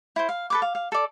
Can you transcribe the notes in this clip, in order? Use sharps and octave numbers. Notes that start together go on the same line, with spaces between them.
E4 C5
F5
A4 B4 D6
F5
F5
A4 D5